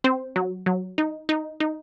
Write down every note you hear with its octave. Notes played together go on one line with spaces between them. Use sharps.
C4 C5
F#3
F#3
D#4
D#4
D#4